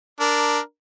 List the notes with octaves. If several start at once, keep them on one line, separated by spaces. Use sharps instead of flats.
D4 A#4